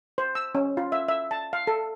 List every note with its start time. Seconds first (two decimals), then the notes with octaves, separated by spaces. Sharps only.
0.18 C5
0.35 E6
0.55 C#4
0.77 F4
0.92 E5
1.08 E5
1.31 A5
1.53 F5
1.67 A4